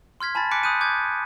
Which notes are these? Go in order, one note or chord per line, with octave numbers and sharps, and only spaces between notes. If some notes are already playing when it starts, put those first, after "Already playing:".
C6 F6 G#6 B6
G#5 A5 B5 C6 A6
G#5 D6 F#6 B6 C#7 D7
B5 D#6 F#6 G6 D#7
D6 G6 G#6